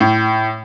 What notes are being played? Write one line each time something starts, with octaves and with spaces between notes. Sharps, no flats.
A2